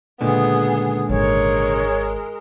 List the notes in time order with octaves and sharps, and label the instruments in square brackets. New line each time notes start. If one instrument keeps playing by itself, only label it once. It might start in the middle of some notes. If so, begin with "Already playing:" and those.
[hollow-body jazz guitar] C#2 A#2 D3 [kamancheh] B3 G#4
[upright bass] G#1 [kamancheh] G#3 A#4 [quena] C#5